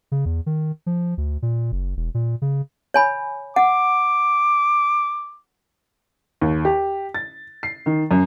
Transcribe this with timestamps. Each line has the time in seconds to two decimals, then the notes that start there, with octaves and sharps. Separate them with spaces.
0.12 C#3
0.26 E2
0.46 D#3
0.86 F3
1.18 D2
1.42 A#2
1.72 F#1
1.97 E1
2.14 A#2
2.42 C#3
2.94 C#5 G#5 B5
3.56 F#5 D6
6.42 D#2
6.65 G4
7.15 A6
7.63 C7
7.86 D#3
8.11 F#2